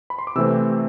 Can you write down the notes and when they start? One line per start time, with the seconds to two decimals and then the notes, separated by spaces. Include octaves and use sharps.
0.10 B5
0.18 C6
0.27 D6
0.35 C3 E3 A3 C4 E6